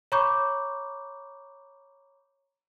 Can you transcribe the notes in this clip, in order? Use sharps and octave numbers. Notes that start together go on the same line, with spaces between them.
C#5 A#5 B5 C#6 D6 G6